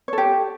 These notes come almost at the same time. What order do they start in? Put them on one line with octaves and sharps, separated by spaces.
C#5 A4 G4